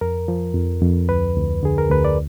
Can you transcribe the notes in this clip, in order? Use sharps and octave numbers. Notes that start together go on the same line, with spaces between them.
F2 A#4
F3
F2
F2
D2 B4
D2
D3 G#4
A#4
D2 B4
D5